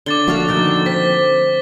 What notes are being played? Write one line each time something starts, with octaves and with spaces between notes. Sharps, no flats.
D3 D6 A6 G7
F3 A3 A#3 F#4 A4 F5
D3 D#3 D#4 A6
C4 B6